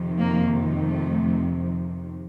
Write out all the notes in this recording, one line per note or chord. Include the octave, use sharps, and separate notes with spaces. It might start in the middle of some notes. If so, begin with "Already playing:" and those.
Already playing: F2 C3 D#3
A#3
A3